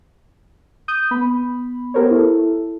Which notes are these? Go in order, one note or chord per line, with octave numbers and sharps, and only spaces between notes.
D#6 G6 D#7
B3 B5
B3 G4 A#4 C5 C#5
E4 A4